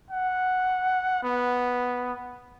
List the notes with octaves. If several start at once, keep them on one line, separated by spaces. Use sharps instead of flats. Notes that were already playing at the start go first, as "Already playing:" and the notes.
F#5
B3